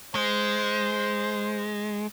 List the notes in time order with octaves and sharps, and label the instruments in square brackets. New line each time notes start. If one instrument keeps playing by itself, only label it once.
[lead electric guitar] G#3 [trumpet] C5